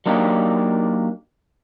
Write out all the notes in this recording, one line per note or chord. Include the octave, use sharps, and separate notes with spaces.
F#3 A#3 D4 D#4 G4